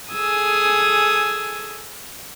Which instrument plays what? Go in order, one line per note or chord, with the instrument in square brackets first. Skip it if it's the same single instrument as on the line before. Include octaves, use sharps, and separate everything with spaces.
[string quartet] G#4 A4 G#5 D#6 E6